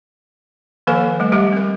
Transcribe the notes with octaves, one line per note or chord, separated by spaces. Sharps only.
D#3 F3 A#3 A4 B4 G#5
G3 A3
G3 G#3 G4
C4 A#4